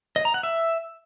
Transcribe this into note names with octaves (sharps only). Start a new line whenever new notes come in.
D#5
A#5
F#5
E5